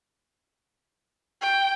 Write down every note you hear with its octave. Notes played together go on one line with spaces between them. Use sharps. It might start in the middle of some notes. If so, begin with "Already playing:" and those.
G5